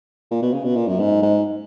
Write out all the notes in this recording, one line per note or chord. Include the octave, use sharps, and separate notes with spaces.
A#2
B2
C#3
B2
A#2
F#2
G#2
G#2